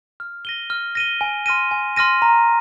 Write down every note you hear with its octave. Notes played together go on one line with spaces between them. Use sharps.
F6
A#6 D#7 G7
F6
A#6 D#7 G7
G#5
C6 F6 A#6 D#7
G#5
C6 F6 A#6 D#7
A#5